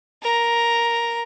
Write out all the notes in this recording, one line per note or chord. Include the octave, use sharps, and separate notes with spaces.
A#4 A#5